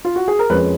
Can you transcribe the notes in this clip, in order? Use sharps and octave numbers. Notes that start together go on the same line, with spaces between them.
F4
F#4
G#4
A#4
F2 F3 G#3 C#4 B4